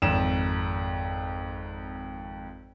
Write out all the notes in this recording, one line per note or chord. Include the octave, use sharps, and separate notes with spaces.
G#1 F2 E7